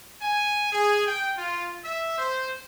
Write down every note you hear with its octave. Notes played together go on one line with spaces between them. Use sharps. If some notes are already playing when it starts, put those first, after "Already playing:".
G#5
G#4
G5
F4
E5
C5